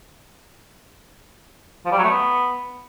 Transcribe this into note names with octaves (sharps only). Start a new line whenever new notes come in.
F3
G3
F#3
A3
B3